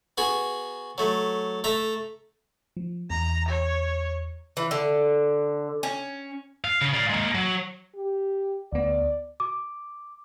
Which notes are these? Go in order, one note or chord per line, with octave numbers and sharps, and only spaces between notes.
B3 F#4 G#4
F#3 A3
A3 E5 A#5
F3
E2 A#5
C#5
E3
D3
C#4
F5
C#3
D5 F5
G#3 A#3
F#3
G4
D2 B3 D5
D6